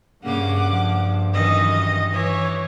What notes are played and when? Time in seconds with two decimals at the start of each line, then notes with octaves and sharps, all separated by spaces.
0.24 G2 C#3 A#3 F#5 D6
0.67 F3
1.34 F#2 D#3 E3 D#5
2.13 E3 C#5